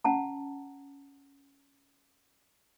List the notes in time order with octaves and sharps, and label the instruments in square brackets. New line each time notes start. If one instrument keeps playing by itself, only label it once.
[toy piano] C#4 F#5 A5 A#5